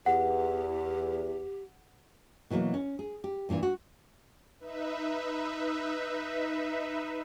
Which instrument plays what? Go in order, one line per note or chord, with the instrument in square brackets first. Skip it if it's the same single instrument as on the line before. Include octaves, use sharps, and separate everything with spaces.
[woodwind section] E2 [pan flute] G4 [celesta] F#5
[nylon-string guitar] B2 E3 F#3 G3 A#3
C#4
G#4
G4
G2 A#2 D#3 E3
F#4
[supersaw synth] D#4 B4 E5